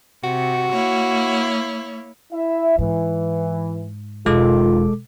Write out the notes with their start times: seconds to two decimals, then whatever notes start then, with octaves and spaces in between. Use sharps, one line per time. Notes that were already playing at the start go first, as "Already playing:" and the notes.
0.24 C3 F#4
0.72 A#3 E4 C#5
2.33 E4 E5
2.78 G#2 E3
4.26 E1 D#3 G#3 F4 A4 D6